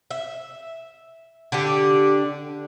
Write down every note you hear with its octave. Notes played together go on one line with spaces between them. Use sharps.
E5
D3 D4 G4